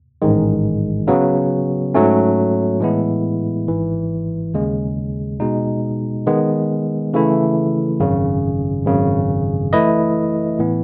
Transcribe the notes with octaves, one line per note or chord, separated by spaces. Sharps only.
A1 G#2 D#3 G#3
C#3 F#3 B3
G#2 F#3 A3 C#4
A2 E3 G#3 B3 E4
G#1 G#2 E3
D#2 C#3 G#3
B2 G#3 D#4
D#3 G#3 B3
C#3 E3 A3 E4
G#1 F#2 C#3
G#1 F#2 C#3
E3 A3 E4 B4 D#5
A2 E3 B3